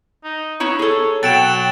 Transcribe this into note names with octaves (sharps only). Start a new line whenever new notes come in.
D#4
B3 D#4 E4 C#5
G#4 A4
B2 F#3 G5 A6 D7 E7